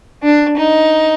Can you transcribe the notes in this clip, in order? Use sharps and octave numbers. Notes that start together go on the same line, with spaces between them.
D4
D#4